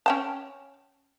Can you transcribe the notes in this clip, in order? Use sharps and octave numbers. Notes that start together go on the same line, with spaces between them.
C#4 G5 A5